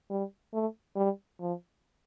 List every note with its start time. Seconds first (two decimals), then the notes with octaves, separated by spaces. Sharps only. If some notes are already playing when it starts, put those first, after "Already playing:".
0.10 G3
0.53 A3
0.96 G3
1.40 F3